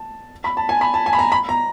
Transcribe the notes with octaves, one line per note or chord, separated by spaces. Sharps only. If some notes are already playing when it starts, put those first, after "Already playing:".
Already playing: A5
B5
A5
G#5
B5
A5
G#5
B5
A#5
B5
A#5